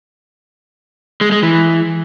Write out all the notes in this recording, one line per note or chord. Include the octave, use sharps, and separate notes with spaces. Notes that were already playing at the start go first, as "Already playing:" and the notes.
G#3
G#3
E3